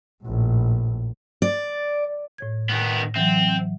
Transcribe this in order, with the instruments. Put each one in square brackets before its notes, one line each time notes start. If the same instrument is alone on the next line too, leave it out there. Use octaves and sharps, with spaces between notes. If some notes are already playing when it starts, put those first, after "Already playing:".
[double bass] A#1 A2
[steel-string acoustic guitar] D5
[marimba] A2 C#5 G#6
[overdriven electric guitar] D#3 B3
[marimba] E3 F#3 [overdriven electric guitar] C4